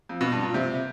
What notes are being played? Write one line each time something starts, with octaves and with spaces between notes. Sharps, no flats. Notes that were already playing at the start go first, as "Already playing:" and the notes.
F2
B2
G2
A#2
C3